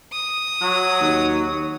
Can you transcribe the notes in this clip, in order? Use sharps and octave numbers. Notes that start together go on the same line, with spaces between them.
D#6
F#3
D#2